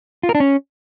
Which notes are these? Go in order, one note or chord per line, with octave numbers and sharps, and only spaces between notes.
F4
A#4
D4
C#4